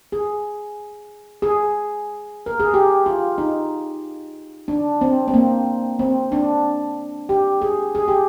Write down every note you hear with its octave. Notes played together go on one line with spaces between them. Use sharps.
G#4
G#4
A#4
G#4
G4
F4
D#4
D4
C4
C4
A#3
C4
D4
G4
G#4
G#4
G4